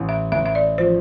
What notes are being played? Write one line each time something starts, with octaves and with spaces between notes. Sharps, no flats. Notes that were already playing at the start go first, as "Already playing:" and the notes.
Already playing: A1
E5
A1 E5
E5
D5
F3 C5